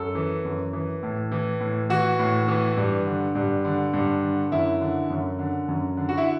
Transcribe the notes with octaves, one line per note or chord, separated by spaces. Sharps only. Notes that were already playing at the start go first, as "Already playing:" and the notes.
Already playing: F#2 A4
E3
F#2
E3
A2
E3
A2
E3 F#4
A2
E3
G2
D3
G2
D3
G2
D3
F#2 E4
D3
F#2
D3
F#2
D3
F#4
E4